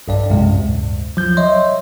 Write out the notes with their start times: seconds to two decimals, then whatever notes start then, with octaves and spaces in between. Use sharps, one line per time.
0.08 B1 G2 D5
0.30 F#2 A2 C3 G#3
0.54 D2 G2
1.17 F3 F#3 G6
1.37 C#5 D#5 E5 C6